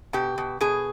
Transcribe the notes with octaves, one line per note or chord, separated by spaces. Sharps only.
B2 G4
B2
B2 G#4